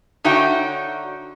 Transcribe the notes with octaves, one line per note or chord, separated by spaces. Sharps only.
D3 D#4 F#4 C#5 E5 G5